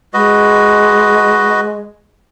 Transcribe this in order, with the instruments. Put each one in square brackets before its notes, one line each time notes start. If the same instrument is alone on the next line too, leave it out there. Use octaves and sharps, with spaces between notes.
[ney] G#3 [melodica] F#4 B4 D#5